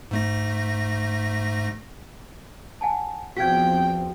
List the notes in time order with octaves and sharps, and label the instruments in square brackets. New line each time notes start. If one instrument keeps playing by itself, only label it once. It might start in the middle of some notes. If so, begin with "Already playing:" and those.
[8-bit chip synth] G#2 A3 A#6
[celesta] F#5 G#5 A5
[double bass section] E2 F3 C4 [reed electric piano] F#4 F5 [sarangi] G5 [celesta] G#6 B6